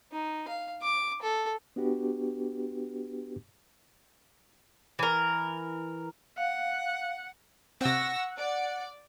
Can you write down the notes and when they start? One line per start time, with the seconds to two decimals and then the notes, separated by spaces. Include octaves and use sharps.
0.12 D#4
0.48 F5
0.83 D6
1.22 A4
1.76 B3 D4 F#4 G4 B4
4.99 E3 A#4
6.38 F5 F#5
7.81 C3 C4 F#5 C#6 E6 A#6
8.37 D5